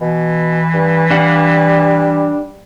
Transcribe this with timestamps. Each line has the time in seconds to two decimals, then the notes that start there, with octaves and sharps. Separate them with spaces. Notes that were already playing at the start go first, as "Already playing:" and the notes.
0.01 B2 E3
0.74 G2
1.11 G3 D4 F5 F#5